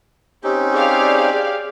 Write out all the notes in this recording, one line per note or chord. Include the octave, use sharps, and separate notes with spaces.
C4 C#4 D#4 G4
G4 G#4 D5 F5